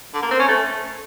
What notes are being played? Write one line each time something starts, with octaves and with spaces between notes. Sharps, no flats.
D3
A#3
C4
C#4
A3